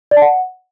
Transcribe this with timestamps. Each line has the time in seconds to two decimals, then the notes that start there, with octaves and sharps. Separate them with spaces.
0.11 D5
0.17 A5
0.22 F#5